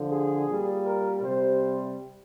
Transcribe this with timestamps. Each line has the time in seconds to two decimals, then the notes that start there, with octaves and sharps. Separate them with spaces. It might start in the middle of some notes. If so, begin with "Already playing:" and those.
Already playing: D3 F3
0.09 G#4
0.47 A#2 G3
0.84 A#4
1.22 C3 G3 C5